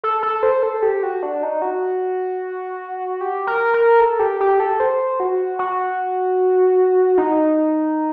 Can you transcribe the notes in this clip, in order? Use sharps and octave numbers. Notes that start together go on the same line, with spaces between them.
A4
A4
C5
A4
G4
F#4
D4
D#4
F#4
G4
A#4
A#4
A4
G4
G4
A4
C5
F#4
F#4
D#4